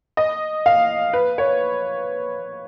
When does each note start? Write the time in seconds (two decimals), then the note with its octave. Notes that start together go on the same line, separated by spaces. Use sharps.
0.17 D#5
0.66 F5
1.13 B4
1.38 C#5